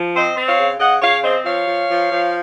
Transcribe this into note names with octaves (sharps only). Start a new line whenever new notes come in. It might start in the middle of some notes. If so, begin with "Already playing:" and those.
Already playing: F3
C4 C5 D#5
C4
C#5 F5
C#3
C#3 D#5 F#5
C#3 C#5 F5
C4 C5 D#5
F3 C#5 F5
F3
F3
F3